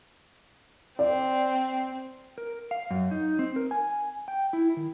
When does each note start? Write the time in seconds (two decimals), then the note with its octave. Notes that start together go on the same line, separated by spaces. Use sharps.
0.99 C4 D5
2.38 A#4
2.71 F5
2.91 F#2
3.11 D#4
3.39 C4
3.56 A#4
3.71 G#5
4.28 G5
4.53 E4
4.77 D#3